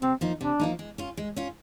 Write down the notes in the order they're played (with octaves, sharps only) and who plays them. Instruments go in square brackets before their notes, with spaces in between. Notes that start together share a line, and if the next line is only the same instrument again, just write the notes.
[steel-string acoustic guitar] C3 [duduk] C4
[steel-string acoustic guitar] F3 A#3 D#4
[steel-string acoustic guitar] C3 [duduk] D4
[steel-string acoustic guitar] F3 A#3 D#4
G#3
C#4 F4
G#3
C#4 F4